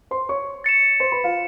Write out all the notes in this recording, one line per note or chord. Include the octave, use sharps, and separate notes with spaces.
C5 C6
C#5 C#6
A6 C#7 E7
C5 C6
B4 B5
F4 F5